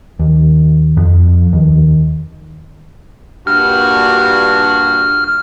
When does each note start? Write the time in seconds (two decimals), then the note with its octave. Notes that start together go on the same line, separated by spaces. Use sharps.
0.19 D#2
0.97 F2
1.53 D#2
3.47 G2 A#2 F#4 F6